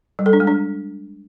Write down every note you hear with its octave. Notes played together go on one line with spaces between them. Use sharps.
G3
A4
D4
G#3
D4